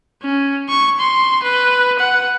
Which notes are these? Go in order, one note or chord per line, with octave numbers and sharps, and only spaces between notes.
C#4
C#6
C6
B4
F#5